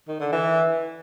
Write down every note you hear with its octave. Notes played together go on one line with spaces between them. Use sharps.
D#3
D3
E3